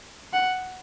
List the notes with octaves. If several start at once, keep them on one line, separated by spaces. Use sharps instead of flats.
F#5